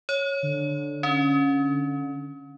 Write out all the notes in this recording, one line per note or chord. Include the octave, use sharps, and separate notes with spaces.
C#5
D3
C#4